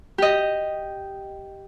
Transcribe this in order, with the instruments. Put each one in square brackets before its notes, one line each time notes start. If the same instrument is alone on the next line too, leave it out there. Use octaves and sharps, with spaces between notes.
[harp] G4 D#5